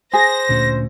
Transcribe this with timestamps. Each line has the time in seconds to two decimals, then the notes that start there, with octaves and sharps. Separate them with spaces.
0.14 G#4 C5 A#6
0.49 D2 A#2 C#4